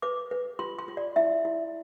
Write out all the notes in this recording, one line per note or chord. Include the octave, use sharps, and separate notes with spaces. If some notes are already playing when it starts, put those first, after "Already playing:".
B4 D6
B4
F4 C6
C6
F4
D5
E4 E5
E4